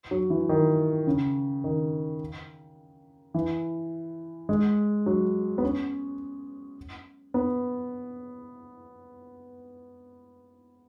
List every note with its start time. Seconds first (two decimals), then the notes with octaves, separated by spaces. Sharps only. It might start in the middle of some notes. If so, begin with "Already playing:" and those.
0.11 F#3
0.30 E3
0.49 D#3
1.07 C#3
1.64 D#3
3.34 E3
4.49 G#3
5.06 F#3
5.58 B3
5.63 C#4
7.34 B3